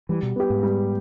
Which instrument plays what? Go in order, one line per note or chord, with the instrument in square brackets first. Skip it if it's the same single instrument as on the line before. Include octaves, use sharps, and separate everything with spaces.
[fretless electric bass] E3 [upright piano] G3
[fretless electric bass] B2
[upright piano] B3 G4
[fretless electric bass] G#2
[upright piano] G3